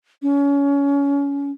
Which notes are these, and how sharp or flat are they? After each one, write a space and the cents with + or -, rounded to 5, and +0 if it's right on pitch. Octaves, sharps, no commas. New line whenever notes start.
C#4 +25